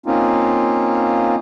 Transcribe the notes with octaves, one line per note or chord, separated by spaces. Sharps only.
A#3 C4 C#4 D#4 F4